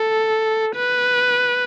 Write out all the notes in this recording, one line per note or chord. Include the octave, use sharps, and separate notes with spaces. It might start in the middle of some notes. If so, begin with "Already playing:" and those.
Already playing: A4
B4